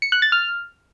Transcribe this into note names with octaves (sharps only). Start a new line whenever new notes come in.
C#7
F#6
A6
F6